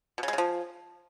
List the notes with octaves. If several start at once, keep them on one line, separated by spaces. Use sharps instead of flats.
B2
C#3
G#3
C#3
F3